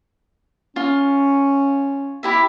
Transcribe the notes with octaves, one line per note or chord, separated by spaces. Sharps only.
C#4 F4
E4 G4 E5